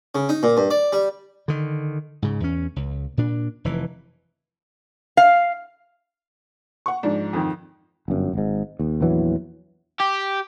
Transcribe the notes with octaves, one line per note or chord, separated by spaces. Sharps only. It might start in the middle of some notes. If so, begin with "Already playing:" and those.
C#3
D#4
A#2
G2
D5
G3
D3 D#3
G#2 C#3
E2 C#4
C#2
A#2 D4
F1 E3
F5
F#5 C#6
G#2 F3 D4
F2 D#3
G1 F#2
G#1 G#2
D#2
A#1 E2 E3 F#3
G4